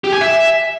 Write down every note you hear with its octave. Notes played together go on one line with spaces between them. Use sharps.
G4
G#5
E5